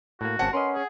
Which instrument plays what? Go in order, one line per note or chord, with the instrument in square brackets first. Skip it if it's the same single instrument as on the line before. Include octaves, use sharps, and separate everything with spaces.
[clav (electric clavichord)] A2 A#3 [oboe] F#4
[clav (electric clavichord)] G#1 C4 C#4 [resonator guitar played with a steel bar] F#5 [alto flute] A5
[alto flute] C#4 [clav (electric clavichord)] A#4 B4 D#5 [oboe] C6
[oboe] G#4